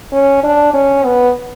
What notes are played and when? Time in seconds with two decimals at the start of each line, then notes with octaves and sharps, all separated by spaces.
0.13 C#4
0.43 D4
0.74 C#4
1.04 B3